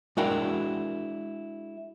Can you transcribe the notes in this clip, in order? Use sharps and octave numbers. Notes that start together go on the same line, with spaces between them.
G#3 D4 E4 F#4 A#4 G5